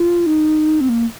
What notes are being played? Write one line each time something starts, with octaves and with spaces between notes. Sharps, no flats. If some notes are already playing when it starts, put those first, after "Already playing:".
Already playing: F4
D#4
C4
A#3